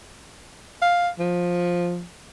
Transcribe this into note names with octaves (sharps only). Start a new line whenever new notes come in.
F5
F3